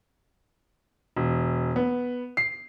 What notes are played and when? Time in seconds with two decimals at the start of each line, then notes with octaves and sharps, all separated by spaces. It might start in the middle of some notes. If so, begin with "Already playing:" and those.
1.16 E1
1.76 B3
2.37 C7